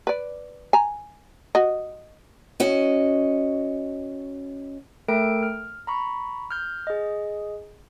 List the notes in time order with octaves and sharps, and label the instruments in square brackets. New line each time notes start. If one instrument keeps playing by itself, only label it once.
[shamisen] B4 D5
G#5 A#5
F#4 D#5
[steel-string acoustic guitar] C#4 F#4 D#5
[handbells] A3 A4 A#4 G5 D7
F6
A#5 B5 C#6
F6 G6
G#4 D#5